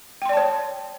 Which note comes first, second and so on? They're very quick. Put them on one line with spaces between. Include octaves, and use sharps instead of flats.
G5 C6 D5 A5 C#5